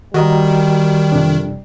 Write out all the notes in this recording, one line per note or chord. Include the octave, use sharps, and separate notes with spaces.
D#3 G3 F#4 D#5 A#5
F2 C3 D4